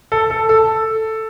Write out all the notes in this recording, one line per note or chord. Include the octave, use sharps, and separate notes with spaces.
A4
A4
A4